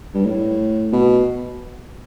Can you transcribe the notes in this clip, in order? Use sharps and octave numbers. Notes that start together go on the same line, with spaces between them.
G2
A2
B2